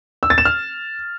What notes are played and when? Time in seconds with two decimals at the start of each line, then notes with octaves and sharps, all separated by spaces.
0.23 E6
0.30 A6
0.38 E7
0.45 F6